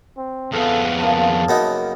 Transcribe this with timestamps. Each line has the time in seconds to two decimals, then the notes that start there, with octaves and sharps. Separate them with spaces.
0.17 C4
0.53 F2 B3 G#4 A4 F5
0.99 C#3 F3 A#3 A5
1.49 F#2 B3 D#4